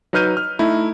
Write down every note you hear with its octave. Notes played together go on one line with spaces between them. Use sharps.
F#3 D#4 B4 F6 G6 D#7
F6
A3 D#4 E4